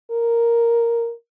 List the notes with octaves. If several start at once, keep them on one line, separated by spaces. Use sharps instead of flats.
A#4